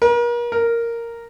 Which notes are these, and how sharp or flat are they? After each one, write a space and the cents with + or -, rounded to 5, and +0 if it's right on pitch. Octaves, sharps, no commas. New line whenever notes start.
A#4 +40
A#4 -5